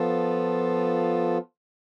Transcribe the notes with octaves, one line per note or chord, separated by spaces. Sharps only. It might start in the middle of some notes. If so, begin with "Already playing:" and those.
Already playing: F3 B3 F4 A4